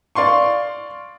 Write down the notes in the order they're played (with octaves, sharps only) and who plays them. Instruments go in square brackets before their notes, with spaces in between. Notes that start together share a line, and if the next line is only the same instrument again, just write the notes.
[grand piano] D5 F5 C6 C#6